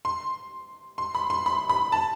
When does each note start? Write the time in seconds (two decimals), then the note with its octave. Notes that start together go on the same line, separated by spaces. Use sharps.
0.05 C6
0.98 C6
1.15 B5
1.30 C6
1.46 B5
1.69 B5
1.92 A5